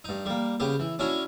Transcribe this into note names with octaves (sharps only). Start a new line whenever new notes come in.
G2 D#4
G3 A#3
C#3 B3 G4
E3
C#4 D4 E4 F#4 C#5